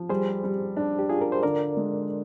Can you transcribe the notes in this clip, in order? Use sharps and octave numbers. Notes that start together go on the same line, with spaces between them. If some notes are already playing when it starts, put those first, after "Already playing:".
Already playing: F3
G3 G#4 C5
G3
D4
G4
F4 G#4
A#4
C5
D3 A#4 D5
G#3